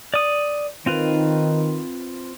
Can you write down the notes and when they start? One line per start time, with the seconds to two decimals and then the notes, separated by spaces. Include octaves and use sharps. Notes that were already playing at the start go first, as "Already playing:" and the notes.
0.14 D5 D#6
0.86 D#3 C4 F4 B4